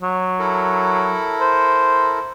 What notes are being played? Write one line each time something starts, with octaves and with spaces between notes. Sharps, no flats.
F#3
E4 A4 A#4
C5